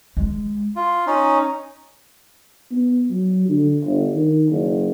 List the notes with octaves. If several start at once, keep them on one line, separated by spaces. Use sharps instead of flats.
G#3
F4
C#4 D#4
B3
F#3
D3
G1
D#3
F#1